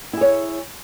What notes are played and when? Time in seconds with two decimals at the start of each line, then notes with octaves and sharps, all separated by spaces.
0.13 E4
0.17 G#4
0.21 C#5